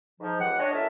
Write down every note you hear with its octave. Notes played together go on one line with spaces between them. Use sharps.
G#2 F3
C#2 G#3 G4 F#5
D4 C#5 D#5
F#2 A2 C#4 A#4 E5 A5